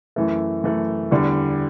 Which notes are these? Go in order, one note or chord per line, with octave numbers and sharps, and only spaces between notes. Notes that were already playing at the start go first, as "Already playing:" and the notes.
F#2 E3 A3
F#2 E3 A3
E2 D3 G3